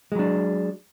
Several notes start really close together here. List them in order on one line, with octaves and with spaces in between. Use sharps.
G#3 F#3 D4